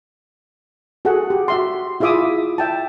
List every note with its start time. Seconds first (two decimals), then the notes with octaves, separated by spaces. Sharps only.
1.05 F#4 G#4 A4 F#5
1.30 G4
1.48 F#4 E5 C6
2.00 E4 F4 G#4 E5 D6 D#6
2.58 E5 G5 A5